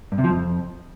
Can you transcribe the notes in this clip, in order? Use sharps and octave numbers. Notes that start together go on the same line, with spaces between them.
G2
C3
F3
F2